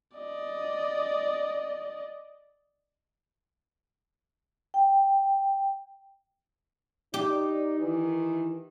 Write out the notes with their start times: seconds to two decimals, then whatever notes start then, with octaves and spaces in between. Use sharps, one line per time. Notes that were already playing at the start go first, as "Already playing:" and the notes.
0.16 D5 D#5
4.74 G5
7.14 D#4 G4 D5
7.79 D#3 E3 E4